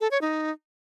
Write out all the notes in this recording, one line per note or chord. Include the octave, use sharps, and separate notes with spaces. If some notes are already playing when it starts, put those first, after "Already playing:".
A4
C#5
D#4